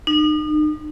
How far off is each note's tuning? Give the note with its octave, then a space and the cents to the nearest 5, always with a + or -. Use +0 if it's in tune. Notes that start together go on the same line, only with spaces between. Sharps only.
D#4 -40